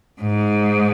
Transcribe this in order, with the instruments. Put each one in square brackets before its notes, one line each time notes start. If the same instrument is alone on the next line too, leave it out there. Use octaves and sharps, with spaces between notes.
[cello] G#2